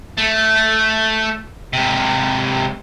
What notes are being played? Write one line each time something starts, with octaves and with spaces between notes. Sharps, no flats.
A3
G#2 C3